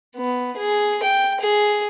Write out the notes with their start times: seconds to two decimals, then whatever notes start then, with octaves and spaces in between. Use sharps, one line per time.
0.16 B3
0.57 G#4
1.03 G5
1.40 G#4